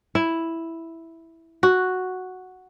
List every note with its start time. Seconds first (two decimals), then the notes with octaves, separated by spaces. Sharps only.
0.15 E4
1.63 F#4